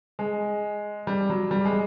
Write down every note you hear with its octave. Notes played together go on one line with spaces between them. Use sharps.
G#3
G3
F#3
G3
G#3